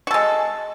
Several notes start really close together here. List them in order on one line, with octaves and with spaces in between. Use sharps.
F#4 A4 G#3